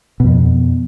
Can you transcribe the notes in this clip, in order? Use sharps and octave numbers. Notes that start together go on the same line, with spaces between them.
F2 B2